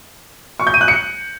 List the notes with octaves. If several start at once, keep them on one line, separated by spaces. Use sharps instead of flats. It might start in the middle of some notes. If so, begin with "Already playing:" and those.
C#6
G6
D#7
F#6
C#7